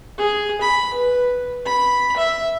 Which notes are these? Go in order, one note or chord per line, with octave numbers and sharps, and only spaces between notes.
G#4
B5
B4
B5
E5